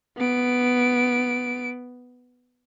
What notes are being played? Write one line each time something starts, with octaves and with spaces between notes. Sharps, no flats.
B3 D7